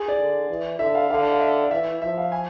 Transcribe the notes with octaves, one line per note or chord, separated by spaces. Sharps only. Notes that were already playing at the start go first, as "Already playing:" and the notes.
Already playing: G#4
D5
D3
E3
D3 E5
F5
D3 F5
F5
E5
D5
E3 E5
F3 E5
F5
G#5